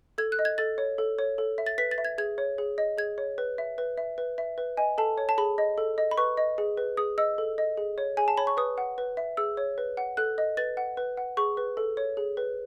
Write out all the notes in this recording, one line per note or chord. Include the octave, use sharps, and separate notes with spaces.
A4 G#6
F#6
D#5
G#6
A4 A6
C#5
A4
C#5
A4
E5
A6
B4 B6
A6
E5
G#6
G#4 G#6
C#5
G#4
D#5
G#4 G#6
C#5
B4
E5
B4
E5
B4
E5
B4
D#5 G#5
A4 A5
C#5
A5
G#4 B5
D#5
A4
D#5
B5
B4 C#6
D#5
G#4
B4
G#4 D#6
D#5 E6
A4
D#5
G#4
C#5
G#4 G#5
A5
C#5 B5
C#6
B4 D#6
F#5
B4
E5
G#4 E6
C#5
B4
F#5
A4 F#6
D#5
B4 A6
F#5
B4
F#5
G#4 C#6
B4
A4
C#5
G#4
B4